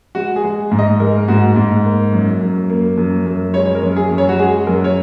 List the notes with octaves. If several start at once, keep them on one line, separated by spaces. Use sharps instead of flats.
G#3 F#4
G#4
G#3
G#2
D#5
G#3 A#4
G#2 F#4
G#2
A#3
F#2
F#2
A#3
F#2
F#2
G#3 C#5
C#5
A#4
F#2
G#4
F#2
C#5
F#4
G#3 G#4
F#2 A#4
C#5